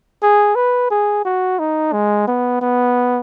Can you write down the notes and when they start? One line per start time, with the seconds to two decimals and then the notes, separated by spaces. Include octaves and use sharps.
0.22 G#4
0.56 B4
0.91 G#4
1.25 F#4
1.59 D#4
1.93 G#3
2.28 B3
2.61 B3